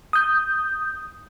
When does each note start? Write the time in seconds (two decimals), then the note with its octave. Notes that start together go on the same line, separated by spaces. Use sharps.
0.13 D#6 G6